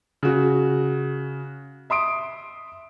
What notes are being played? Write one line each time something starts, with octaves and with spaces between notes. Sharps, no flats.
C#3 F#4
E5 C6 D#6 D7